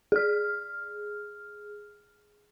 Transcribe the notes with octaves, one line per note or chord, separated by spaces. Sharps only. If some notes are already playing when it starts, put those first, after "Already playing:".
G#4 F6